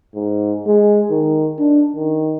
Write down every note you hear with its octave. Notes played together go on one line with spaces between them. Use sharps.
G#2
G#3
D#3
D4
D#3